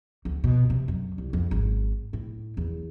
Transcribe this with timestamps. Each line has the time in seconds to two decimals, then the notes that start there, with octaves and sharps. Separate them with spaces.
0.25 D2
0.44 B2
0.70 C3
0.88 F#2
1.18 C2
1.33 F2
1.51 G#1
2.13 A2
2.57 E2